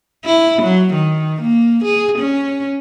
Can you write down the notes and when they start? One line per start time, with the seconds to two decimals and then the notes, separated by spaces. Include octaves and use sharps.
0.25 E4
0.62 F#3
0.94 D#3
1.42 A#3
1.84 G#4
2.19 C#4